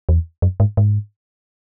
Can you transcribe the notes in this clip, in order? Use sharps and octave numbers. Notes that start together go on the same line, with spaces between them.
E2
F#2
G#2
G#2